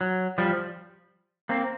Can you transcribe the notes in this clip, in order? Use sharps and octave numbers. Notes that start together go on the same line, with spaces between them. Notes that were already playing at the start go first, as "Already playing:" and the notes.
F#3
F3 G3
A#3 C4